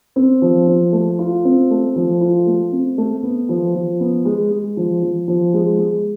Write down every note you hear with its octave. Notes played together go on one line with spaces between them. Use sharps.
C4
F3
F3
A3
F4
C4
A3
F3
F4
A3
C4
A3
B3
F3
F3
B3
G#3
G#3
F3
F3
F3
G#3
G#3